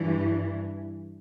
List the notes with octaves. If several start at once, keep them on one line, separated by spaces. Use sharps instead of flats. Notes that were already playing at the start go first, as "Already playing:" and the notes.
Already playing: G2 E3